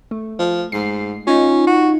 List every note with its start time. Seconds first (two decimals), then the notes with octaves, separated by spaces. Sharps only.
0.11 A3
0.39 F3
0.72 G#2 C7
1.27 C#4 D#4 F4
1.67 F#4